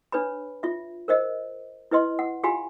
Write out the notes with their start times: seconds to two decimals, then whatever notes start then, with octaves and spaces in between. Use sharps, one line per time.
0.12 D4 B4 C#5 B5
0.63 F4 E5
1.08 A#4 C5 D#5
1.91 E4 B4 D#5 C6
2.19 F#5
2.43 F4 G4 F5 G#5 B5 C6